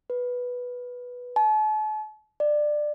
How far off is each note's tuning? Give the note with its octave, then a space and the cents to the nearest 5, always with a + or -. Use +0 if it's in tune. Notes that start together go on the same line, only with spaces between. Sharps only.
B4 -5
A5 -40
D5 +20